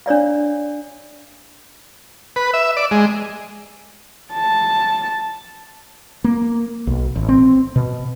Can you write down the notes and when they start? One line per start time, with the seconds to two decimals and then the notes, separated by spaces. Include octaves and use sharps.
0.06 D4 C#5 D5 F5
2.36 B4
2.54 E5
2.77 D5
2.91 G#3
4.33 A5
6.24 A#3
6.87 B1
7.16 A1
7.29 C4
7.76 B2